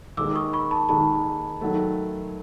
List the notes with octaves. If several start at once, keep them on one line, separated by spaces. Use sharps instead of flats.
D#2 D#3 G#3 D6 E6
C#6 D#6
B5 C#6
A5 B5
D#2 D#3 G#3 A5 B5
D#3 F#3 A3